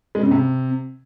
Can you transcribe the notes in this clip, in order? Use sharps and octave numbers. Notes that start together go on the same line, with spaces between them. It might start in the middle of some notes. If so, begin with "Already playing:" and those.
G#3
C#3
C3